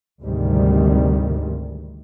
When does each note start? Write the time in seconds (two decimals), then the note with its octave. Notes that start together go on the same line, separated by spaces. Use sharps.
0.22 D2 G#2 C3 D#3 G3